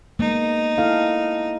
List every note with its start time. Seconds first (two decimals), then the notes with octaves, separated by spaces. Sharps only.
0.19 G#3 A#3 B3 D#4
0.78 E4 A4 F5